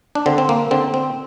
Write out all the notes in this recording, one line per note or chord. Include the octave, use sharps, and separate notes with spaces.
D4
D3 C4
C4
A#3
D3 C4
C4